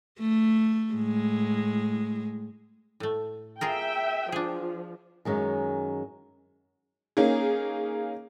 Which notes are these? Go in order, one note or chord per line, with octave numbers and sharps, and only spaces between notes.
A3
A2 G#3
A2 A3
F4 G#4 A#4 E5 G5
F3 D4 G#4
F#2 D#3 G#3 C#4
A#3 C#4 D#4 G#4